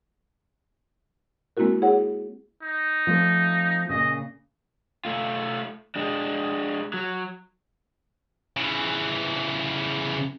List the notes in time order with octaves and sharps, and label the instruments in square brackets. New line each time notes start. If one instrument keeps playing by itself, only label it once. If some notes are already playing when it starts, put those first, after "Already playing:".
[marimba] G#3 A#3 C4 E4 F#4 A#4
E4 G#4 C#5 F#5
[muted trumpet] D#4
[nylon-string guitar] F3 A3 C4
[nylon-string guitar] A#2 C#3 [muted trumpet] D#5
[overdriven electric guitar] A3 F4
G#3 D4
F#3
[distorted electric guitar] C#3 E3